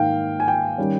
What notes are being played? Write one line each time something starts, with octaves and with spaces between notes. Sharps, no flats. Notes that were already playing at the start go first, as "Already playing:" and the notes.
Already playing: G#2 D#3 A#3 F5 G5
G#5
G5
D#3 G3 C#4